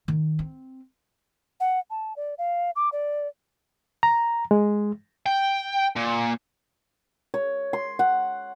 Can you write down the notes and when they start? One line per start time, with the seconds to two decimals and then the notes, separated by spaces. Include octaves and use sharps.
0.08 D#3
0.39 C4
1.60 F#5
1.90 A5
2.16 D5
2.38 F5
2.76 D6
2.92 D5
4.03 A#5
4.51 G#3
5.26 G5
5.96 A#2
7.34 C#5
7.73 C6
7.99 F#5